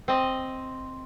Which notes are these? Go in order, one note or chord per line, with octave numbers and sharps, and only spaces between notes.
C4 D#5